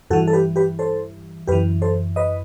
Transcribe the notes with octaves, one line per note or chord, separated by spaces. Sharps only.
G2 E3 F#4 A4
A4
G4 B4
G4 B4
A4 C5
F#2 E3 G4 B4
A4 C5
B4 D#5